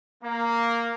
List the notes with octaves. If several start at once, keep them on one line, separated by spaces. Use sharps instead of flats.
A#3